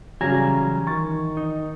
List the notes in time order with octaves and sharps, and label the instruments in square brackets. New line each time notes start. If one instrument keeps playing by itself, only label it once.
[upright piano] C#3 F#3 G3 [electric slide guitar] E3 G#5 A#5
[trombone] D#3 [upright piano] C#6 A6
[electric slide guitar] D#4